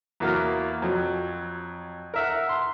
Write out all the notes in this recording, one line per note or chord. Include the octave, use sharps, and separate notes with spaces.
E2 F#3 A#3 F#4 A#4 F6
F2 F#3
A#4 E5 F#5
C6